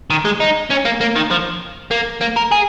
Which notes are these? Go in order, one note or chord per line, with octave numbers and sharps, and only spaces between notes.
D#3
G#3
D#4
C#4
A#3
A#3
D#3
F3
A#3
A#3
A#4
G#4